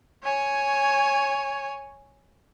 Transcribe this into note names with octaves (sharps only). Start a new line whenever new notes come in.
C#5 G#5